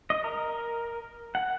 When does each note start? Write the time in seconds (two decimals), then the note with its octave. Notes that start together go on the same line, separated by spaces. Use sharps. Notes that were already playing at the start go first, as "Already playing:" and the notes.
0.10 D#5
0.24 A#4
1.35 F#5